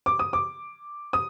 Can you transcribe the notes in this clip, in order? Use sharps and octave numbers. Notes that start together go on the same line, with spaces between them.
D6
D#6
D6
D#6